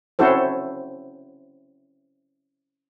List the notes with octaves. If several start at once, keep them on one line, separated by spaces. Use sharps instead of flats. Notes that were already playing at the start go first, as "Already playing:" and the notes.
C4 C#4 E4 F#4 A4 C5